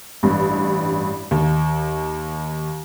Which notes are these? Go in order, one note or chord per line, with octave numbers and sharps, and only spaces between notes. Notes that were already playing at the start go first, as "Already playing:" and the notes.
A1 G2
D#2